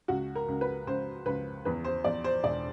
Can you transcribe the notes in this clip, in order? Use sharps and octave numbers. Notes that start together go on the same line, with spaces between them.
C#2 F#4
A#4
C#2
B4
C#2 C5
C#2 B4
E2 B4
C5
E2 D5
C5
E1 D5